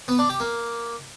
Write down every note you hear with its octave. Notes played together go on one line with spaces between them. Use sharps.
B3
D4
G4
A#3